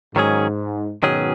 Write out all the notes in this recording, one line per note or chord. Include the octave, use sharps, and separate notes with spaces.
G#2 D#3 F#3 C#4 G#4
G#2 B2 D#3 F#3 C#4 G#4